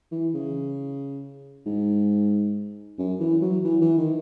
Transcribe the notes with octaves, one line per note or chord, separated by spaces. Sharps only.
E3
C#3
G#2
F#2
E3
F#3
E3
E3
D#3